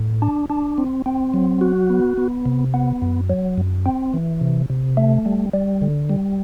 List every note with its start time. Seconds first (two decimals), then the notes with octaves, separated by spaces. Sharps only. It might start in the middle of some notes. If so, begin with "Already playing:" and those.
Already playing: A2
0.22 D4
0.50 D4
0.78 C4
1.06 C4
1.34 F#3
1.61 F#4
1.90 B3
2.17 B3
2.46 C3
2.74 B3
3.02 F#2
3.30 F#3
3.58 F#2
3.86 C4
4.14 E3
4.41 C3
4.70 C3
4.97 A3
5.26 G3
5.53 G3
5.82 D3
6.09 G3